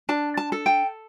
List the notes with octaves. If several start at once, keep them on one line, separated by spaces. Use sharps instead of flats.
D4 A5
A5
A4
G5